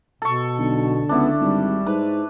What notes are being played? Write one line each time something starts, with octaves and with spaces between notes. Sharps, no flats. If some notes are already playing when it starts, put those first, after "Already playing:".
B2 A4 C#6
B1 D3
C#2 B3 D4 E4
G#1 G3
G#2 B4